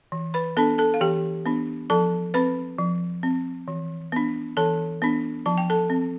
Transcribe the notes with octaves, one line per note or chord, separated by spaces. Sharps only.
E3
B4 B5
B3 D4 A4 A5
A4 A5
F5
E3 G4 G5
B3 D4
F3 A4 A5
C4 B4 B5
F3
C4
E3
B3 D4
E3 A4 A5
B3 D4
F3 A5
G5
A4 A5
C4